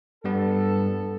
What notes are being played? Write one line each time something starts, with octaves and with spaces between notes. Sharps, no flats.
G2 G3 B3 A4